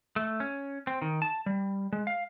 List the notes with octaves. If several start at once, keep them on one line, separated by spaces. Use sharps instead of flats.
A3
C#4
C4
D#3
A5
G3
G#3
F5